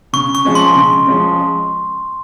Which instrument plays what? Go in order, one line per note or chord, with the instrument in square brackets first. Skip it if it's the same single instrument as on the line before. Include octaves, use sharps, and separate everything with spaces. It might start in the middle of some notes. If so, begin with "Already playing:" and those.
[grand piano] C#3 [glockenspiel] C#6
[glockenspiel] C#6
[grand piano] F3 G#3 C#4
[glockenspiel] C6
[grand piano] C#3
F3 G#3 C#4